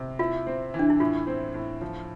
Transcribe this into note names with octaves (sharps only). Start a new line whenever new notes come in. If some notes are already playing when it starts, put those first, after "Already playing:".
Already playing: C3
E4 F4
C4
E3
D4
E4
A2 F4
C4
A2
F3